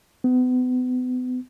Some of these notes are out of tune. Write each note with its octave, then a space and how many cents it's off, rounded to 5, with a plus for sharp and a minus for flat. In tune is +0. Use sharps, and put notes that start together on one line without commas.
B3 +35